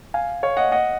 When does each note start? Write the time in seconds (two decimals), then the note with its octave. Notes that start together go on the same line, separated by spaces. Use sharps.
0.14 F5 G#5
0.43 C#5 F5
0.57 D#5 F#5
0.72 D#5 F#5